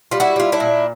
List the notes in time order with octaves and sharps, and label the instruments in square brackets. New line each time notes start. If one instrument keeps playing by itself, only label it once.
[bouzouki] G3 F4
E4 F#4
G3 F4
D4 E4
A#2